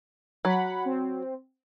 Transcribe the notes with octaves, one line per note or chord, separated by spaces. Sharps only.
F#3 F#5 B5
C4